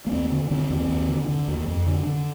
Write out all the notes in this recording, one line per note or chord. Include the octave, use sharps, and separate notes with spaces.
A#3
D#2 C4
D3
D3 C4
D#2
D#2
D3
D3
D#2
F2
D3
D3